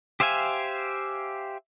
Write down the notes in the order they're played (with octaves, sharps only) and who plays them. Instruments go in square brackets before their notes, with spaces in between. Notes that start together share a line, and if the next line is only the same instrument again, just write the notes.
[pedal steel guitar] G4 C5 E5 F5 G#5